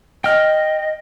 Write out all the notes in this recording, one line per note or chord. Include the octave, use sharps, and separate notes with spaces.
D#5 G5 F6